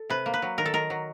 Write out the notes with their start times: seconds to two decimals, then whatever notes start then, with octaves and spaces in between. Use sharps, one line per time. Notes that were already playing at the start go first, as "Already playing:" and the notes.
Already playing: A4
0.10 C3 B4
0.26 A#3
0.34 B4
0.42 F#3
0.58 D#3 A#4
0.66 A4
0.74 D#3 A#4
0.90 F#3